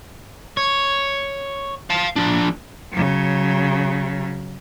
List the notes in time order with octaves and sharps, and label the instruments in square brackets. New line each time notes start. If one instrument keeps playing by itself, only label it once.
[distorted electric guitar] C#5
F5 A5
F3 D4
[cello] C#3 F#3